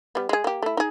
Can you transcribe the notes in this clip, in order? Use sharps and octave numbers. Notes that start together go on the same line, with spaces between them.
G3 B3
G#3 G#4
A#3 G4
A3 E4
D#4 G#4